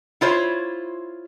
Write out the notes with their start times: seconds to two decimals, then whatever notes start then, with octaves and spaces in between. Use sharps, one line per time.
0.21 E4 F4 C5 C#5